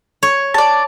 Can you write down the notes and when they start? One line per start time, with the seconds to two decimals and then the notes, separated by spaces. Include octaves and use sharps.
0.23 C#5
0.54 D5 A5